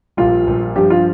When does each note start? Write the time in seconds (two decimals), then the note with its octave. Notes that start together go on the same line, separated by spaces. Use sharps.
0.17 A#1 A#2 G3 F4
0.47 A#1 A#2 G3
0.76 G2 F3 D4 G4
0.90 F4